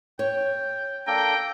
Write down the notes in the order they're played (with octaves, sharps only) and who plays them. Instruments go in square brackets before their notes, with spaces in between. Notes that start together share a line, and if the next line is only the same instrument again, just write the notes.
[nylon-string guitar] C#5 [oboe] G5
[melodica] A#3 D4 A4 [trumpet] G5 [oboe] A#5